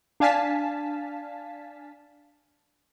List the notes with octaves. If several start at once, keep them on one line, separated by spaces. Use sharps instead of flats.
D4 F5 G#5 A5 B6